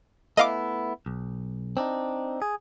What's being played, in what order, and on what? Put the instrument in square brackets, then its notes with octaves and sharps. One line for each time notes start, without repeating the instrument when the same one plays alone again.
[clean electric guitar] A3 B3 E4 [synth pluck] D#5 F5 D6
[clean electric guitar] B1
C4 D4 D#4
G#4